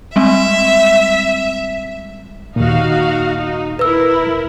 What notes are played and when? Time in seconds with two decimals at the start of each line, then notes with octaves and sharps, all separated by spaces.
0.16 G3 G#3 C4 E5
2.56 D#2 A#2 D#4 F#4 F5
3.36 D#4
3.79 E4 A#4 B4 E6